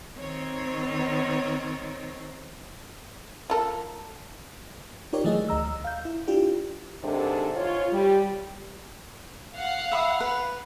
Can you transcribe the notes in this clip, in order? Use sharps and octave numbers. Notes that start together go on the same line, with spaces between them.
D#3 C4 C#5
F4 A4 A#4
D#4 F4 G4 A#4 C#5 D5
D#3 E3 F#3 A3 G#4 D#5
D2 D#5 A#5 E6
F5 G6
E4
D4 E4 F4 G4
G#2 C3 D#3 D4 A4 C5
G#2 F4 C#5
G3
F5 F#5
E5 B5 D#6
B4